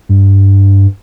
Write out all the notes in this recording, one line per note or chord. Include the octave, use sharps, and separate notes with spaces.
G2